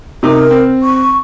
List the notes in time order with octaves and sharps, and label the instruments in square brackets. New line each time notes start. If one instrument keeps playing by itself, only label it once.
[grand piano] C3 D#4 [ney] A#4
[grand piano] C4
[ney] C#6